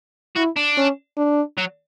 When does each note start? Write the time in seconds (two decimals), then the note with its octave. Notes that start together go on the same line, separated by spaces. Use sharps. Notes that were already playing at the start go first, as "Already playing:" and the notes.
0.36 E4 F#4
0.57 D4
0.77 C#4
1.17 D4
1.58 F#3